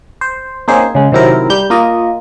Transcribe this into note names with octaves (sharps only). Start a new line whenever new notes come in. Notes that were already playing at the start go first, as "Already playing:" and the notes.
C5
A#3 C4 C#4 D#4 G#4 C5
C#3 G#3
C3 D#3 F#3 C4 E4 A#4
G3 G4 G6
A#3 F4 D#5